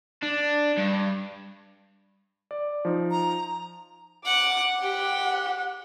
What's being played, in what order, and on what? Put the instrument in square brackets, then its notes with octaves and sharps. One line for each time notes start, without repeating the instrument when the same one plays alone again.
[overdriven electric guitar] D4
G2
[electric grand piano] D5
F3 D#4
[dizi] A#5
[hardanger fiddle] F#5 [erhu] D6
[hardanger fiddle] G4 [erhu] F#5